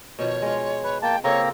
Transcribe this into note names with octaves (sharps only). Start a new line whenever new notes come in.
B2 D#3 F3 C#5
G#3 F4
B4
A#3 G5 A5
C#3 A#3 C4 F4 A4 C#5 A#5